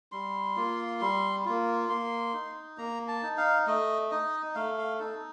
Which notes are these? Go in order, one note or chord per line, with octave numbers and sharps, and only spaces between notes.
G3 C6
A#3 F4
G3
A#3 F4
A#3 C6
D#4
A#3 A#5
A5
D#4
F5
A3 D#5
D#4 D#5
A3 F5
F5
D#4 A4